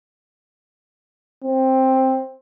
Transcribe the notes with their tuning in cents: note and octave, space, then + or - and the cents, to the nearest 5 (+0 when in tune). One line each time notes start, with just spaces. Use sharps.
C4 +10